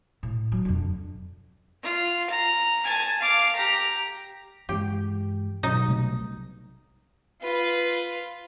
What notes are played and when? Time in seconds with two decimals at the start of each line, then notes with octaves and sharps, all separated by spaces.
0.23 A2
0.52 F#3
0.65 F2 D3
1.83 F4
2.31 A#5
2.84 G#5 A5
3.21 F5 D6
3.56 G4 A#5
4.69 G2 E3 G#3 G4
5.63 B1 D#4
5.88 C3 G3 A3
7.42 F4 B4